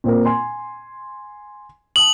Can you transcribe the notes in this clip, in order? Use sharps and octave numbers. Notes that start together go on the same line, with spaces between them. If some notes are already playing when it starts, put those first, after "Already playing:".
A#2 C4 A#4
G#5 C6
A5 D#6 F#7